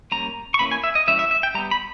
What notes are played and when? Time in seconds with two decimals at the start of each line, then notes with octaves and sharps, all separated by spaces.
0.12 G3 A#3 C#4 A#5
0.54 C#6
0.59 E3 A#3 C#4 B5
0.71 G#5
0.84 E5
0.95 D#5
1.07 E3 G3 C#4 E5
1.19 E5
1.31 E5
1.43 G5
1.54 G3 A#5
1.58 B3
1.71 B5